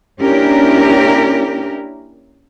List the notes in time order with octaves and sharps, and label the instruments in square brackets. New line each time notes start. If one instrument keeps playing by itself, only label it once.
[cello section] A#3 C#4 D4 E4 G4 A#4